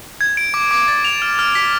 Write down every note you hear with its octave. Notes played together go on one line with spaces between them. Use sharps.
G#6
D7
D6
D6
A6
F7
F6
F6
B6